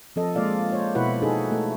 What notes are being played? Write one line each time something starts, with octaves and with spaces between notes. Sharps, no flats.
F3 C4 A4 D#5
G#3 A#3 F4 D5 F5
C5 C#5
B2 E4 F#4 B4 F#5
D#4 F#4 G#4 A4
A3